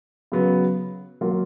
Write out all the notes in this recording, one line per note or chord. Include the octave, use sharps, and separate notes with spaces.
C#3 F#3 B3
F#3 A#3 F4